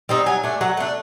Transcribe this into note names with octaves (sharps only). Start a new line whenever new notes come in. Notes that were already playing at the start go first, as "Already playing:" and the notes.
G3 C4 D#4
F#3 G#5
A3 D4
F#3 F#5
A3 D4